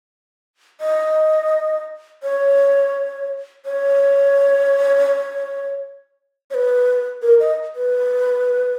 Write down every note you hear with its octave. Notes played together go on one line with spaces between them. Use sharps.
D#5
C#5
C#5
C#5
B4
A#4
D#5
B4